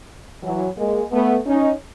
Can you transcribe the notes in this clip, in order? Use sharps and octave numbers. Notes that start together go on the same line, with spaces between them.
E3 F#3
G#3 A#3
A3 B3
C#4 D#4